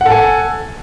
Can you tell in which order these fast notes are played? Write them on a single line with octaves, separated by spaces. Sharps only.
F#5 A4 G#5